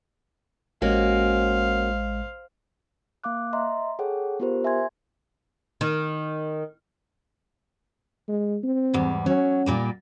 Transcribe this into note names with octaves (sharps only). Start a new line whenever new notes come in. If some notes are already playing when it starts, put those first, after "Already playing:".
A1 G#3 A#3 C#4 F#4 C5 D#5 F5
A#3 F5 D6 F#6
D#5 E5 A#5 C6
G#4 A4 C#5 F#5 G5
B3 F4 G4 A#4 C5
E5 G#5 C6 G#6
D#3
G#3
C4
E2 G#2 G3
F#3 C#4
A#2 G3 A#3